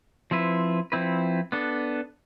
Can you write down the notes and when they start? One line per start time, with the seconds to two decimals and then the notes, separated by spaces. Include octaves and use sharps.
0.31 F3 C4 E4 B4
0.92 F3 C4 E4 B4
1.52 B3 D4 A4